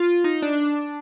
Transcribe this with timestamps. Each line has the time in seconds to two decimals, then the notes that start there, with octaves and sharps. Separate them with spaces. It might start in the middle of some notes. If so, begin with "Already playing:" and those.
Already playing: F4
0.24 D#4
0.42 D4